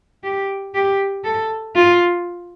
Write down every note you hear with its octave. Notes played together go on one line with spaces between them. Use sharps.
G4
G4
A4
F4